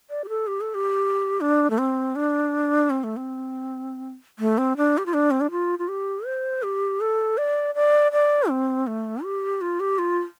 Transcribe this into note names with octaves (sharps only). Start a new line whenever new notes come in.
D5
G4
A4
G4
A4
G4
D4
A3
C4
D4
C4
A3
C4
A3
C4
D4
G4
F4
D4
C4
D4
F4
F4
G4
C5
G4
A4
D5
D5
D5
C4
A3
G4
F4
G4
F4